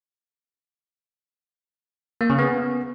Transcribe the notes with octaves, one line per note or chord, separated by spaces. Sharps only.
A#3
C#3
B3